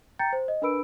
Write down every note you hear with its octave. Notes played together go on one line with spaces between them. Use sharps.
G5 A#5 G6 A6 C#7
C5
D#5
D4 A#4 B4 B5 E6 D7